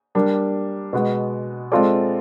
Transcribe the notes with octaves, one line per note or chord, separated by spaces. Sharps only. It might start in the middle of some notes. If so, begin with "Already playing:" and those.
G3 A#3 D4
B2 G#3 B3
G#3 C4 F4 A4 D5